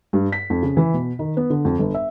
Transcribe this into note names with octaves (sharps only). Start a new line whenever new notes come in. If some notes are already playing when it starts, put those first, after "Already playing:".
G2
B6
F2
C#3
E3
B2
D#3
B3
D3
F2
G1
E5